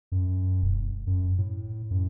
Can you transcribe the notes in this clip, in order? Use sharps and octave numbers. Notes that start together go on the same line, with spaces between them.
F#2
E1
F#2
A2
F#2